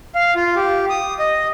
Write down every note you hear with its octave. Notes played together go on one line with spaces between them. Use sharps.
F5
F4
G4
D#6
D#5